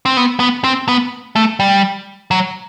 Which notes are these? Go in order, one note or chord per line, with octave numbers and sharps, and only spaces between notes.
C4
B3
B3
C4
B3
A3
G3
F#3